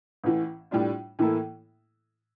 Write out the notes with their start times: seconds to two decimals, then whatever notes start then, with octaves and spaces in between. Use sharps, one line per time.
0.24 A1 A2 E3
0.71 A2 G3 D4 F4
1.19 A2 E3 A#3 E4 A4